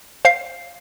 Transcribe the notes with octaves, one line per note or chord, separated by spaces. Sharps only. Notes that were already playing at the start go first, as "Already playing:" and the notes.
C5 F5 C7